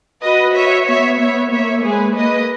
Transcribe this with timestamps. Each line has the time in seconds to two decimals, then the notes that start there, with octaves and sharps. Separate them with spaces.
0.23 F#4 B4 D#5
0.55 C#5 E5
0.87 B3 C#5 E5
1.19 B3 C#5 E5
1.52 A#3 C#5 E5
1.84 G#3 G#4 B4
2.16 A#3 B4 D#5